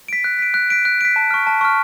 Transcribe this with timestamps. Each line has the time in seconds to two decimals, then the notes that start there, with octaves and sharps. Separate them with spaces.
0.08 B6 D7
0.24 F#6
0.39 B6 D7
0.54 F#6
0.70 B6 D7
0.85 F#6
1.01 B6 D7
1.16 A5
1.31 C#6 F6
1.47 A5
1.61 C#6 F6